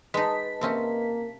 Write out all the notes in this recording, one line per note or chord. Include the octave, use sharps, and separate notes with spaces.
G#3 D#4 B4 D#5 A5 B6
C3 A#3 C4 C#4